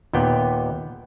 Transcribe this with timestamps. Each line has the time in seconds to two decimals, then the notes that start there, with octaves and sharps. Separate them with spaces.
0.13 D#2 A#2 B3 G5